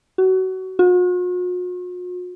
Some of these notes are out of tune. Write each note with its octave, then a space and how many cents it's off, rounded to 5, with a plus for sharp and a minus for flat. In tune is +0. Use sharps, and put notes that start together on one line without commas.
F#4 +25
F#4 -45